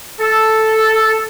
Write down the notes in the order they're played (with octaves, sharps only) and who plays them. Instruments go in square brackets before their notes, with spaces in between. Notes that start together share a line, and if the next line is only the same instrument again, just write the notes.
[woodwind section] A4